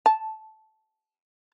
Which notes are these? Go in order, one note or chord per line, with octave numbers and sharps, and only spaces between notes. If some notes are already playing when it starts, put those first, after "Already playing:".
A5